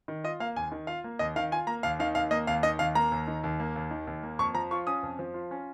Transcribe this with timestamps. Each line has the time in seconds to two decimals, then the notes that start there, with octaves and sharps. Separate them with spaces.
0.08 D#3
0.24 F4 D#5
0.40 A#3 F5
0.56 D#2 G#5
0.72 D#3
0.87 F4 F5
1.04 A#3
1.19 D#2 D#5
1.36 D#3 F5
1.52 F4 G#5
1.67 A#3 A#5
1.83 D#2 F5
2.00 D#3 F5
2.15 D#2 F5
2.31 A#3 D#5
2.47 D#2 F5
2.63 D#3 D#5
2.79 D#2 F5
2.95 A#3 A#5
3.12 D#2
3.28 D#3
3.44 D#2
3.60 A#3
3.76 D#2
3.91 D#3
4.07 D#2
4.23 A#3
4.39 F2 C#6
4.54 F3 A#5
4.71 F4 C#6
4.87 C#4 D#6
5.03 F2
5.19 F3
5.34 F4
5.51 C#4